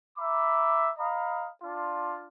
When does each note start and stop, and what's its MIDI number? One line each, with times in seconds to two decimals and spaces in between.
0.18 0.90 76
0.18 0.90 82
0.18 0.90 83
0.18 0.90 86
0.99 1.49 75
0.99 1.49 77
0.99 1.49 82
0.99 1.49 83
0.99 1.49 87
1.63 2.27 62
1.63 2.27 65